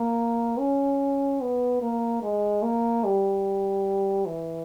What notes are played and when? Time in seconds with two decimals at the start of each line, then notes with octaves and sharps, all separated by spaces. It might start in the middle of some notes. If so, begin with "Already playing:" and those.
Already playing: A#3
0.59 C#4
1.41 B3
1.82 A#3
2.22 G#3
2.63 A#3
3.04 G3
4.26 E3